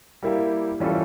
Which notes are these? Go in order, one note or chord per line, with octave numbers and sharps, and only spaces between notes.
G3 A#3 E4 G4
E3 G3 C#4 F4 A4